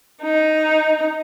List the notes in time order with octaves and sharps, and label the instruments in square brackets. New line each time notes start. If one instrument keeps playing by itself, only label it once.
[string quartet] D#4